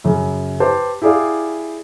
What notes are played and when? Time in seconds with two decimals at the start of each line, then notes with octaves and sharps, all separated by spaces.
0.04 F#2 C#3
0.60 G4 B4 C5 A5
1.02 E4 G4 G#4 D5 F5